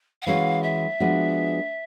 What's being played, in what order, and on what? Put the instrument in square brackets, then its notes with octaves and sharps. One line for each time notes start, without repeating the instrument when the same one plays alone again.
[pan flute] F#5
[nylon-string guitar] E3 G#3 C#4 F#4 [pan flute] F5
[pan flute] E5
[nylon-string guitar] F3 G#3 B3 D4 F#4